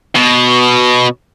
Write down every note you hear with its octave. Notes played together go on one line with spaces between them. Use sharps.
B2